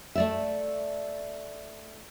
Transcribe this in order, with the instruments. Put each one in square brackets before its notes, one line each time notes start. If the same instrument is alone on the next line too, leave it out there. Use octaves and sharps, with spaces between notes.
[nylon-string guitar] A3 D5 E5